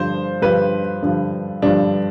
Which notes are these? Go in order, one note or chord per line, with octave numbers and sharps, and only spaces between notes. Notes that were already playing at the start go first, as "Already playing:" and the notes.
Already playing: G2 D3 F3 C5
G2 D3 F3 B4
G2 D3 F3
G2 D3 F3 D4